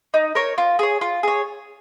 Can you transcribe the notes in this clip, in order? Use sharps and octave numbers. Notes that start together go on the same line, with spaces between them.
D#4
A#4 C#5
F4
G#4 C#5
F4
G#4 C#5